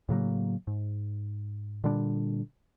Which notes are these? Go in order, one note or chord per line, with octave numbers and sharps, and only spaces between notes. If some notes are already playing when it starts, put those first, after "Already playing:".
A2 C#3 F#3 A#3
G#2
A#2 D3 G3 D4